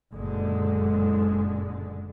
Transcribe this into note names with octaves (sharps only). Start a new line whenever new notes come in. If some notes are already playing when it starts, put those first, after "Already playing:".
F#1 A#2 D3 G#3